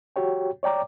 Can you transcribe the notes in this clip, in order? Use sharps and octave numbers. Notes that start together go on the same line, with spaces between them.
F#4 G4 C#5 G5
C#5 D5 G5 A#5 D6